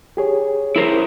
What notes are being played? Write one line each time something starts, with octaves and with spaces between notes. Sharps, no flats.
G4 G#4 C#5
E4 A#4 C5